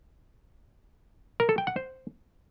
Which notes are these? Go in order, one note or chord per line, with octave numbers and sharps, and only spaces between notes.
A#4
A4
G5
F#5
C5